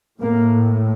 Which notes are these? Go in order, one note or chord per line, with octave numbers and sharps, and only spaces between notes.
A2 A#3